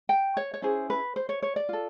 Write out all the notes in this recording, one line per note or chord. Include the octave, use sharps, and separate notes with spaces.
G5
C#5
C#5
C#4 E4 G#4 C5
B4
C5
C#5
C#5
D5
F4 A4